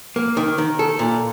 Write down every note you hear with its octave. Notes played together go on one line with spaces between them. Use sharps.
A#3
D#3
D#3
A4
A#2